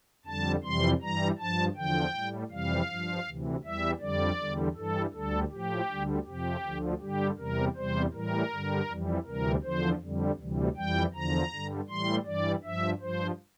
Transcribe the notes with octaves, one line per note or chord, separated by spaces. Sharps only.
F2 D3 G3 A5
F2 C3 E3 G3 C6
G2 E3 G3 A#5
G2 F3 A5
E2 D3 F3 G5
A2 G3
F2 C3 E3 G3 F5
G2 F3
D2 C3 E3
E2 E3 G3 E5
F2 D3 G3 D5
E2 D3 G3
G2 E3 G3 A4
D2 D3 G3 A4
A2 F3 G4
D2 D3 G3
F2 C3 F3 G4
D2 D3 F3
G2 D3 G3 G4
E2 C3 G3 A#4
E2 C3 G3 C5
A2 E3 G3 A#4
G2 D3 G3
F2 E3 G3
D2 C3 E3 G3 A#4
E2 D3 F3 C5
F2 D3 G3
D2 C3 E3 G3
F2 E3 G3 G5
E2 D3 F3 A#5
G2 D3 G3
A2 E3 G3 C6
G2 E3 G3 D5
G2 F3 E5
G2 F3 C5